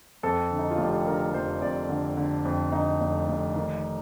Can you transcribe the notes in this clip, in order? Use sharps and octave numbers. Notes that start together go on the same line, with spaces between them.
F2 A4
D3
D#4
F4
F1 G4
A4
D3 A#4
A#4
F1 C5
F2 D5
D3
D3
F2
D3 D#4
F1
F1
D#3